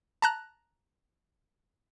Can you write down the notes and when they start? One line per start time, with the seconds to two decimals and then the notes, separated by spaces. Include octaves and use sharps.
0.22 A5 A#5 F#6